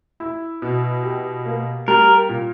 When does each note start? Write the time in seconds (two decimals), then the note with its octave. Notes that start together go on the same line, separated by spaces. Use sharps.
0.20 E4
0.62 B2
1.03 G4
1.46 A#3
1.88 G3 A#4
2.29 A#2